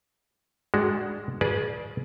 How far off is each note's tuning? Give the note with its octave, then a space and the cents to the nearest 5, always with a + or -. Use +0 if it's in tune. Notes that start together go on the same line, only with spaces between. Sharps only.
G#3 +0 D4 +0 F#4 +20
G#4 +15 B4 -35 D5 +0